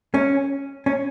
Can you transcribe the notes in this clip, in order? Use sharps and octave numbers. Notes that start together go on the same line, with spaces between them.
C#4
C#4